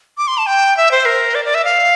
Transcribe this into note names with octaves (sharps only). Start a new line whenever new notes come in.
D6
C6
A5
G5
E5
C5
A#4
D5
D5
E5
F5